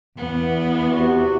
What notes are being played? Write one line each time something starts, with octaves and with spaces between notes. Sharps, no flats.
E2 B3
C3 F#4